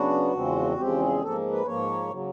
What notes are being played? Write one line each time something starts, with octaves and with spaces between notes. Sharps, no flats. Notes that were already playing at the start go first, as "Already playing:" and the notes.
Already playing: C#3 F#3 B3 D4 F#4
E2 C#3 F3 G#3 C4
E2 C#3 F3 G#3 C4 G4
G#4
G#2 F3 A#3 A4
B4
G#2 F3 A#3 C#5
C#3 F#3